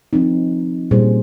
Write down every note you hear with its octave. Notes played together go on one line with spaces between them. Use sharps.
F3 C4 D#4
A#2 G3 C#4 G#4 C5